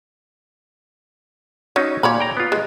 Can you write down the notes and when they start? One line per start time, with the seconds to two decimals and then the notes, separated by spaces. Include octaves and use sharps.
1.76 F#3 C#4 D#4
2.03 A#2 C#5 D5 B5
2.20 G5 A#5
2.37 B3 F4
2.52 G#3